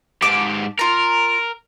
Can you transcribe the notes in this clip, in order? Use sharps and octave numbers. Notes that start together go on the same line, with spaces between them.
G#2 G4 A5 D6
F4 A#4 A#5